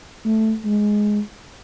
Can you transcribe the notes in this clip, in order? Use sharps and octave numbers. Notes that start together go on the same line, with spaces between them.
A3
G#3